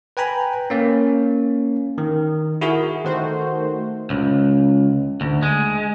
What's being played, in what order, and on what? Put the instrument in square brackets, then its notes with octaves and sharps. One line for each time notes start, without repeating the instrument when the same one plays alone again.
[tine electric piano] B4 G5 G#5 A#5 B5
A#3 C#4
D#3
E4 F#4 G#4 A#4
[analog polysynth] D#3 A3 F#4 C5
[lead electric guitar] C#2
D2
G#3